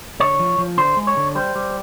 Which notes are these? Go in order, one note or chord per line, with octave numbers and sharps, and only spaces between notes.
D3 C#5
F3
F3
D3 C5
G#3
C#5
D3
G3 C5
G3